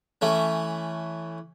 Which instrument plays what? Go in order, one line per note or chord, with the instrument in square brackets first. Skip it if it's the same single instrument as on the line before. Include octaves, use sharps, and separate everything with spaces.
[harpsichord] E3 A3 C#4